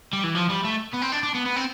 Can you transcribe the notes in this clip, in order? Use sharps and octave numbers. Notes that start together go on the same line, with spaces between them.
G3
E3
F3
G3
A3
B3
C4
D4
D4
B3
B3
C4